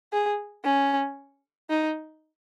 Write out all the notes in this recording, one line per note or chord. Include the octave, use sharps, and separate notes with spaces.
G#4
C#4
D#4